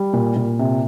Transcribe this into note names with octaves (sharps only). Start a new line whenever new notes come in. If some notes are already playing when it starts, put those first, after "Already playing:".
Already playing: G3
A#2
A#2
C3